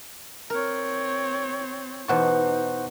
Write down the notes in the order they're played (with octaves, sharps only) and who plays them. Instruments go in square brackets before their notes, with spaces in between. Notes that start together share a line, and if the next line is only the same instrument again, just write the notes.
[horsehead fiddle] C4 C#5 [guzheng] A#4
[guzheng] E2 B2 A5 [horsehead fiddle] D#4 [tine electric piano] C5 F#5 C#6